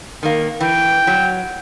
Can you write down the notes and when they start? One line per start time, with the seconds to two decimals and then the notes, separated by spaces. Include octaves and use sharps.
0.23 D#3 A#3
0.60 E3 G5
1.07 F#3